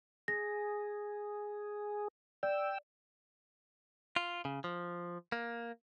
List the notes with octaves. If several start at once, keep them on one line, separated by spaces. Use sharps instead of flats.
G#4 A#6
D5 G5 E6
F4
C#3
F3
A#3